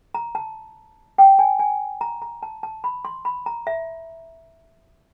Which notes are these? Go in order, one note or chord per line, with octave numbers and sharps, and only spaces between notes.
A#5
A5
G5
G#5
G#5
A#5
A#5
A5
A5
B5
C6
B5
A#5
E5